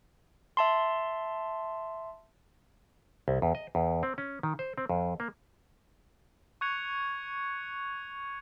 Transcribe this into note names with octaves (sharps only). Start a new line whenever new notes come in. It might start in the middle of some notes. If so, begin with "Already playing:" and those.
E5 A5 C6
C2
E2
D#5
E2
C4
C#4
D#3
C5
C4
F2
A#3
C#6 F#6 G#6 C#7 F7